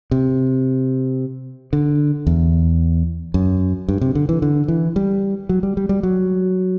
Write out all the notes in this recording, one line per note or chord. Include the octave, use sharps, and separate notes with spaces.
C3
D3
E2
F#2
G2
C3
D3
E3
D3
E3
G3
F#3
G3
G3
G3
F#3